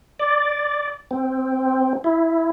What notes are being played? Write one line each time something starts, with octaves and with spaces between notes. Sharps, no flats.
D5
C4
E4